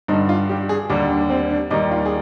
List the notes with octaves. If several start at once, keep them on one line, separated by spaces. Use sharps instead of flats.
G2 D3 G3 D#4
F4
G4
G#4
D#2 D3 G3 D4
D4
C4
D4
D#2 D#3 G3 D#4
F4
G#4